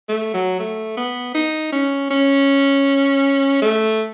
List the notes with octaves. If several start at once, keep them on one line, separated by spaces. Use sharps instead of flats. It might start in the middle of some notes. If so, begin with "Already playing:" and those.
A3
F#3
A3
B3
D#4
C#4
C#4
A3